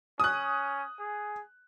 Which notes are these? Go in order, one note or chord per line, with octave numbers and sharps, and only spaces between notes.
C#4 D#6 F#6
G#4